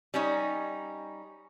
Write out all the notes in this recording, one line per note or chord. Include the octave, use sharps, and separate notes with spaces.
G3 C#4 D#4